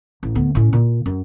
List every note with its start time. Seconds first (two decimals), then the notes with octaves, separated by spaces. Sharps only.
0.23 A1
0.35 D2 B3
0.55 A2 C#4
0.73 A#2
1.06 F#2